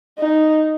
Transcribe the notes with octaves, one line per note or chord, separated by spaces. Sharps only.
D#4